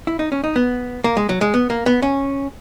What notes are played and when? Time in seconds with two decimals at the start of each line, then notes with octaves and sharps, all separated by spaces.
0.07 E4
0.19 D#4
0.32 C#4
0.44 D#4
0.56 B3
1.04 A#3
1.17 G#3
1.29 F#3
1.41 G#3
1.54 B3
1.70 A#3
1.86 B3
2.02 C#4